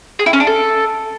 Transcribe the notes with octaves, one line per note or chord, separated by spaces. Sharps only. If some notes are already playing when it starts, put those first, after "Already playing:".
G#4
E4
C#4
D4
A4